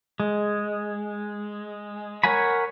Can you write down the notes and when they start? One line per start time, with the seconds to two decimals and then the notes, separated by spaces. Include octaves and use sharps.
0.20 G#3
2.24 A#4 C#5 F#5 G#5 B5